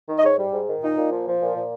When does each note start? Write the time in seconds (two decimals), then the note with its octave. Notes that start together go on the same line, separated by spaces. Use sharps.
0.09 D#3
0.18 D#5
0.23 G#2 C#5
0.38 G3
0.53 G#2
0.67 D#3
0.82 A#2 D#4
0.96 A#2
1.11 F3
1.26 F3
1.41 A#2
1.56 A#2